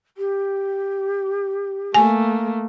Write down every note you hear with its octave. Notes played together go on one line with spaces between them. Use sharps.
G4
A3 A#3 G#5